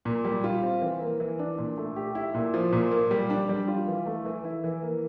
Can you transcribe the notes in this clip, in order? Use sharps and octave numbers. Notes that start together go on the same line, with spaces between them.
A#2
G3
F4
C4
E3
A#3
E3
D4
A#2
A3
G4
E4
A#2
F3
A#2
A#3
G3
D4
G3
F4
E3
A3
E3
E4
E3
A#3